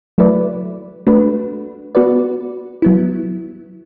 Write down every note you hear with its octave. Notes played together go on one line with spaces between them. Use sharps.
F#3 A3 E4 B4 D5
A3 D4 F#4 B4
B3 F#4 B4 D5
F#3 B3 E4